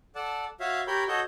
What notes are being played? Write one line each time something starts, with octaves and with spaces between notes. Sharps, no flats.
A4 D5 F#5 A5
F#4 C#5 E5 F5
G4 A#4 C#5 B5 G6
F#4 A4 C#5 D#5 G6